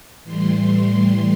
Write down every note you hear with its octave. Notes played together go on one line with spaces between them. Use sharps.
A2 E3 G3 C6